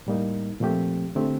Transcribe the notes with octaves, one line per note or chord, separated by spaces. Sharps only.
A2 G3 A#3 D#4
A#2 F3 A3 C4 G4
D3 A3 C4 G4